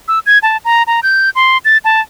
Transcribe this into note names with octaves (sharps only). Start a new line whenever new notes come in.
E6
G#6
A5
A#5
A#5
G6
C6
A6
A5